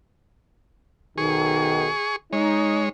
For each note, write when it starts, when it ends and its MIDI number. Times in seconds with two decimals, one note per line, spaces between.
1.18 1.89 35
1.18 1.89 51
1.18 2.16 68
1.18 2.16 85
2.33 2.89 56
2.33 2.87 63
2.33 2.89 73